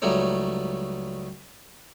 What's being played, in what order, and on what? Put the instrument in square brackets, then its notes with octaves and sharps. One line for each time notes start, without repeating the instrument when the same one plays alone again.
[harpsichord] C#2 F#3 G3 A3 D#4 C#5